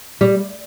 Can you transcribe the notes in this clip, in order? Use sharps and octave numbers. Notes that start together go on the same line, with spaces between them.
G3